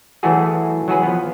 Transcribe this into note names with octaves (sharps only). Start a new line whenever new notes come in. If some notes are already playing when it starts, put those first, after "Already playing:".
E3 F#3 A3 E4 F#4 G#4
F#3 F#4 G#4 B4
F3 B3